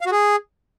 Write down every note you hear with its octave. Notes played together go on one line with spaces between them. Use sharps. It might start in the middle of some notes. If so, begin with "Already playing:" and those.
F5
F#4
G#4